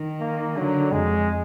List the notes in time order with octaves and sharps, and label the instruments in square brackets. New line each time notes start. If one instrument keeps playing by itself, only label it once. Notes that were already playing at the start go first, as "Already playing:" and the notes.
Already playing: [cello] D#3
[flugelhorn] A#3
[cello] D3 [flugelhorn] F#3
[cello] F2 [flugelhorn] G#3